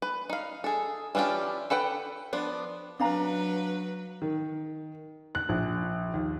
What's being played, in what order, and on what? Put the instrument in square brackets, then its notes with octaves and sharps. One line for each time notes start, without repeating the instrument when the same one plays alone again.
[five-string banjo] B4
D#4 F5
G#4 A4
E3 C#4 D4 F4 G4
A4 B4 F#5 G5
F3 B3 D4
[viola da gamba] F#3 B4 [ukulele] D4 F5 A#5
[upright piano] D#3
F#6
A#1
D#2